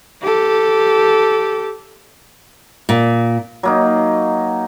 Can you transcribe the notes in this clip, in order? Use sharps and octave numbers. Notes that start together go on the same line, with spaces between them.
G4 A4
A#2
F#3 A#3 D#4